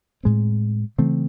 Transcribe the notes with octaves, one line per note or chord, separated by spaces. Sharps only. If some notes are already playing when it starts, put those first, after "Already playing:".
A2 G#3 C4
C#3 E3 A3 C4